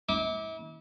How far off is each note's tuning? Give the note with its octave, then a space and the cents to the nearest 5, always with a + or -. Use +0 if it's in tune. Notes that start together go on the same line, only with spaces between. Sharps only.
E4 -40 D6 +0